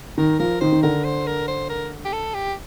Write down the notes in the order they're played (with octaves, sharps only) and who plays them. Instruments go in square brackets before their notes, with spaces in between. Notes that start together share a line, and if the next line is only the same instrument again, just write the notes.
[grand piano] D#3 [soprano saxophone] A#4
[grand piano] F3 [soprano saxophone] A#4
[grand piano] D#3 [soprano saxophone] C5
[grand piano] D#3
[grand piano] D3 [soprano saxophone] A#4
[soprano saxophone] C5
A#4
C5
A#4
G4
A4
G4